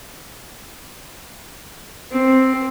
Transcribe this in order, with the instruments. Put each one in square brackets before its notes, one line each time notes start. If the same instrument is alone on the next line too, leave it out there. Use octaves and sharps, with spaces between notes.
[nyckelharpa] C4